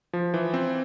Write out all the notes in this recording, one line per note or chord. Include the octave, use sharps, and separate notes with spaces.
F3
E3
C4